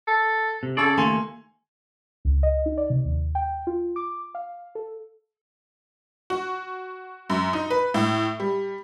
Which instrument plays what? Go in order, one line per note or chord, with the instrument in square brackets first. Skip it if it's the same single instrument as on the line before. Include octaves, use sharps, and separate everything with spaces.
[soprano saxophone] A4
[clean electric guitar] C3
[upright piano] C#3 C#6 E6 [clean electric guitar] G#4 D5 [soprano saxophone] A4
[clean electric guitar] D#2 A3 A#3 [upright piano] G#5 C6
[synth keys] C#2
D#5
D#4
D5
C3
D#2
G5
F4
D6
F5
A4
[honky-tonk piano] F#4
F#2
D#4
B4
A2
G3